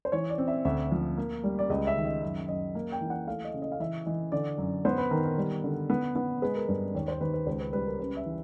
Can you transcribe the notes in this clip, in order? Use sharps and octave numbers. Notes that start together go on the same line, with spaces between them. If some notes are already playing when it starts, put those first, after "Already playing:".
C5
E3 C#5
D5
C4
E5
D2 E5
F3
A#3
G3
D5
C#2 D#5
E5
D#3
D#5
F#2 E5
F#2 D#5
A#3
G5
E3
F#5
A3 F5
D#5
C#3
D#5
F5
E3 E5
E3 D#5
D3 D5
F#2
B3 C5
B4
D#3 A#4
A#4
G3
D3
B3
B3
G#3 B4
A#4
G2 B4
D#2 C#5
C5
D#2 B4
B4
C#2 C5
B4
G3 B4
A#4
C#3 B4
E5
E3